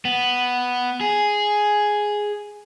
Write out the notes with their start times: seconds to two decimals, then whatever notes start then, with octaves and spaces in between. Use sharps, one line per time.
0.05 B3
1.01 G#4